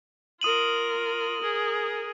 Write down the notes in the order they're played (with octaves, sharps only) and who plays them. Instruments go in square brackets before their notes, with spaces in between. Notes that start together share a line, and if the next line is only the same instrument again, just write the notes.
[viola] F4 A#4 [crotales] D#6 D#7 F#7
[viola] G#4 A#4